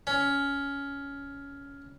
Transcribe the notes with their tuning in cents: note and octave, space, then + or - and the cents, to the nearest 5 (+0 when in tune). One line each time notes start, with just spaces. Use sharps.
C#4 +15